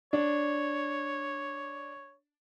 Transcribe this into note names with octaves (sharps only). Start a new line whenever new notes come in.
D4 C#5